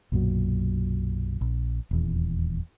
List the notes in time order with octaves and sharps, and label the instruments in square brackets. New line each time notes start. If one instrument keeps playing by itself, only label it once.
[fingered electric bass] B1 F#2 A#2 F#3
A#1
D#1 E2